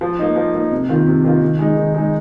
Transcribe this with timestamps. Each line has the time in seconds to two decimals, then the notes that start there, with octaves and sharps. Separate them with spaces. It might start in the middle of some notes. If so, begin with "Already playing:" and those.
0.01 F3
0.19 A#3 D#4
0.36 F3
0.54 A#3 D#4
0.71 C3
0.89 D#3 A#3 F4
1.06 C3
1.24 D#3 A#3 F4
1.42 D#3
1.59 G#3 D#4
1.77 D#3
1.94 G#3 D#4